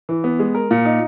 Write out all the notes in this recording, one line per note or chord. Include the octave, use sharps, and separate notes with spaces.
E3
B3
G#3
A#4
A#2
D#4